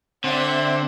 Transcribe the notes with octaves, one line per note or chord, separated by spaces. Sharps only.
D3 C4 D5 E5 F#5